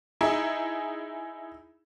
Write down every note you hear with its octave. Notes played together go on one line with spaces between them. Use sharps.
D#4 E4 G#4